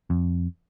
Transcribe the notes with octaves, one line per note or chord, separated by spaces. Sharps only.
F2